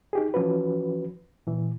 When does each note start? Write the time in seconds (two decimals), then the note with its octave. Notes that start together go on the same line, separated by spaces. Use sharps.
0.13 D#4 G4 G#4
0.34 E3 F3 C#4 F#4 B4
1.47 A#2 E3